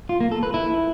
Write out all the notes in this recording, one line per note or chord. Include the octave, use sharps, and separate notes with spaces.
F4
A#3
A4
B4
E4